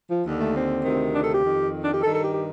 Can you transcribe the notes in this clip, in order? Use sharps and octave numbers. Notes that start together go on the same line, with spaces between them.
F3
D#2 D3
A3
C4
D2 C3 D#3
D4
A4
G4
F2 D#3
D4
G4
G2 D#3 A4
A4
G4
G4